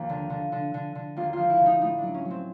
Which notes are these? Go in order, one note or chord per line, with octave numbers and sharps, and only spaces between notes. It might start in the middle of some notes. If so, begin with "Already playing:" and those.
Already playing: D#2 F3
D3
D3
D3
D3
D3
D#2 F4
F4
F3
E4
D3
D#4
A2 D#4
D4
F#3
C#4
F#3
C4